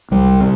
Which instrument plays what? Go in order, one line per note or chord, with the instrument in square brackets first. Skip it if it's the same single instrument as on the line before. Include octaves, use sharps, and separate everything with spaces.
[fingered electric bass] C2 G3
C3